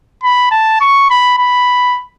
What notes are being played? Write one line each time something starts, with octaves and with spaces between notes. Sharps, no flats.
B5
A5
C#6
B5
B5